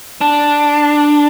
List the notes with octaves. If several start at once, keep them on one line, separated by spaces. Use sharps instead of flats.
D4